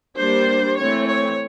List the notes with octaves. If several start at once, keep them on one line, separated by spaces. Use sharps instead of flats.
G3 A#3 D4 C5
E3 A3 C4 C#5
C#5